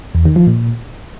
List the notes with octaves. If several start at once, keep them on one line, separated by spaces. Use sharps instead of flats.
E2
D#3
F3
A#2